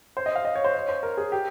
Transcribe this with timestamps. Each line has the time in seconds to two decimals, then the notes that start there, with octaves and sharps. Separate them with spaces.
0.17 C5
0.26 D#5
0.35 F5
0.45 D#5
0.55 C#5
0.64 C5
0.74 C#5
0.89 C5
1.03 A#4
1.17 G#4
1.32 G4